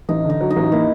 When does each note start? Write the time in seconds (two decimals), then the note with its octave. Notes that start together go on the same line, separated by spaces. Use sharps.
0.09 A1 D#4
0.25 D3 D#4
0.41 F#3
0.51 D#4
0.56 A1
0.72 A#3 E4